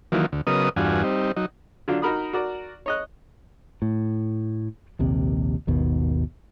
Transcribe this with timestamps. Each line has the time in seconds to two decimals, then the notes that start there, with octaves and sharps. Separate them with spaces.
0.12 D#3 E3 F#3 A#3 F4
0.33 D2
0.47 C#3 F#3 B3 A#4 D#5 D#6
0.76 E2 G2 D4 F4 F#4 G#5
1.03 G3 C4 D#4
1.36 F#3 D#4
1.88 D3 F#3 D4 F4
2.02 D#4 F#4 A#4 B5 D#6
2.33 F#4 A#4 D5
2.86 C#5 D#5 F#6
3.82 A2
4.99 A#1 D#2 C3
5.67 G#1 D#2 B2